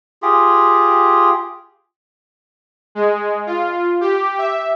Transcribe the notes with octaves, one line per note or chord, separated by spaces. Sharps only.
F4 G4 G#4
G#3
F4
G4
E5